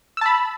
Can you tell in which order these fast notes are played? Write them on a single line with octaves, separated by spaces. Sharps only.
E6 A5 B5